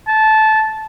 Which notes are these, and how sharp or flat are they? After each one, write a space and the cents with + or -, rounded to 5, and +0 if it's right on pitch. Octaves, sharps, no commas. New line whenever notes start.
A5 -15